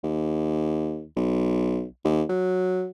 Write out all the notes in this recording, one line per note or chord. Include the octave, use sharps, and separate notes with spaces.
D#2
B1
D#2
F#3